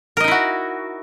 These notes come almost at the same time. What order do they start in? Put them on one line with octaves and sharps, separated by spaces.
A#4 D#5 D#4 E4 F#4